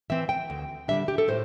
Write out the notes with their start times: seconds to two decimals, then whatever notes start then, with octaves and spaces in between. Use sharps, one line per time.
0.10 E3 C4 E5
0.29 G5
0.50 D2
0.88 D3 G3 D4 E5
1.08 G4
1.18 A4
1.28 A2 C5